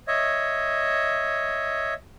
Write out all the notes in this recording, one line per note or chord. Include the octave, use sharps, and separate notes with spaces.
C#5 D#5 E5